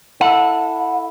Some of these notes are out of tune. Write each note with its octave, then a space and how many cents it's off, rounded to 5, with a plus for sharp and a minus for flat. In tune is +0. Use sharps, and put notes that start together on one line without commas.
E4 +0 A4 +15 F#5 -25